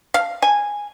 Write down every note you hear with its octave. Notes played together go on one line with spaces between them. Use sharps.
F5
G#5